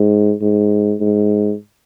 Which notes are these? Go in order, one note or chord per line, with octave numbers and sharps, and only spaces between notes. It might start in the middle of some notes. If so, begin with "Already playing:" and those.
Already playing: G#2
G#2
G#2